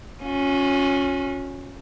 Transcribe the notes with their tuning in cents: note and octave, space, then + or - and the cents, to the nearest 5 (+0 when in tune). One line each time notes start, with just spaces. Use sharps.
C#4 +0 F#4 -45